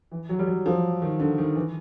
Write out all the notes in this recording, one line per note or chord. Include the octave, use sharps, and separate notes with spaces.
E3
F#3
G3
F#3
F3
D#3
D3
D#3
E3